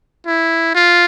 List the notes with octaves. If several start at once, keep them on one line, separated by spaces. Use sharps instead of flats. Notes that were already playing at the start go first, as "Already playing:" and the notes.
E4
F4